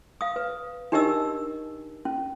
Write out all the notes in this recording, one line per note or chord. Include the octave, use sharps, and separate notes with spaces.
F5 D#6
B4
D4 D#4 G4 A#4 D#5 E6
C#4